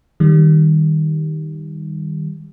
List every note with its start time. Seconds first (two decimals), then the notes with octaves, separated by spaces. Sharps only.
0.20 D#3 G3